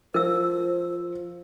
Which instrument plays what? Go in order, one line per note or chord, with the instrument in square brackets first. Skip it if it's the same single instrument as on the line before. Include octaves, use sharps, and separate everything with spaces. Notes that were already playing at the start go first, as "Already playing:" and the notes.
[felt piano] F3 [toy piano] A#4 E6 [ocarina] C5